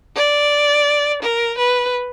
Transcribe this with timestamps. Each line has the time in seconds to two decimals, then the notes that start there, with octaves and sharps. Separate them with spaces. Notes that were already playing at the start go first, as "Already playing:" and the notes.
0.16 D5
1.22 A#4
1.58 B4